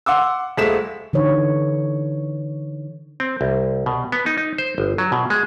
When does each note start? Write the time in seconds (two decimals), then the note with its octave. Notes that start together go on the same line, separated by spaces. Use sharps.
0.06 F#5 C6 D6 E6
0.57 D#1 G#3 A3 B6 E7
1.13 D3 E3 D#4 C#5
3.20 C4
3.41 C2
3.86 B2
4.12 B3
4.26 D#4
4.38 D#4
4.58 C5
4.78 G1
4.98 F#3
5.12 B2
5.30 G#3